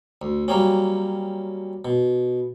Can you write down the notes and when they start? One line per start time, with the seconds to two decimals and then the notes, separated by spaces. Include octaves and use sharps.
0.22 D2
0.48 F#3 G3 A#3 C4 C#4
1.85 B2